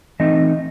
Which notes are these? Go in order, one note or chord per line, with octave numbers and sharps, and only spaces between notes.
E3 A3 C4 D#4 D#5